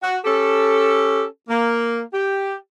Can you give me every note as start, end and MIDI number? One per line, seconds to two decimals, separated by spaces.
0.02 0.17 66
0.25 1.24 61
0.25 1.24 67
0.25 1.24 69
1.49 2.01 58
2.13 2.54 67